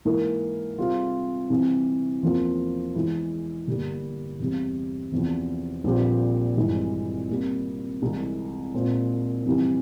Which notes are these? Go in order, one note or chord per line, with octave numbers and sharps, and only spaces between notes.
G#2 E3 A#3 E4 A#4
C3 G3 C4 F4 G#4
C3 E3 G3 C4
E2 C3 F3 A#3 F4
E2 E3 G#3 E4
G1 G2 G3 A#3
E2 C3 G3
E2 C3 F3
A#1 A#2 G3 C4 G4
G#1 G2 E3 G#3 E4
C3 G3 A#3
C2 C3 E3 G#3
A#2 G#3 C4
F2 C3 E3 G3